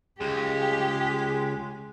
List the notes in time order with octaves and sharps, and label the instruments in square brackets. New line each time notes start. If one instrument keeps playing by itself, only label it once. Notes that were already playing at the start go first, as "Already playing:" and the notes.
[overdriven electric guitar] C#2 [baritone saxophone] G#3 [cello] G4 [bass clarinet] G#4